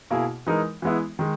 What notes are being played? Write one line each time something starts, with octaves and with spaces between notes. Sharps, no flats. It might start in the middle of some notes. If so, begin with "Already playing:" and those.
B2 A#3 E4 G#4
E3 G#3 D#4 A#4
E3 G#3 B3 E4
D#3 G#3